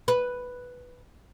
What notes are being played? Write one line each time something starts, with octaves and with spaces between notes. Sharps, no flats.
B4